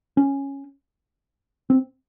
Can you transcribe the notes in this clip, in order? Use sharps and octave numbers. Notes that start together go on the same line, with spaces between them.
C#4
C4